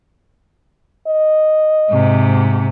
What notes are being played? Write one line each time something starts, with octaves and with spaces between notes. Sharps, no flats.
D#5
G#2 C3